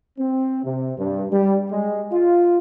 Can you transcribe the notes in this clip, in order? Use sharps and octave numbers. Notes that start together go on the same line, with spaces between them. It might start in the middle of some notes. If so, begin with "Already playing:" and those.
C4
C3
G2
G3
G#3
F4